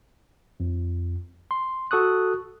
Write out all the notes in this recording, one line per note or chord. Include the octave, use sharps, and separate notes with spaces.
F2
C6
F#4 A4 C#6 D#6 F#6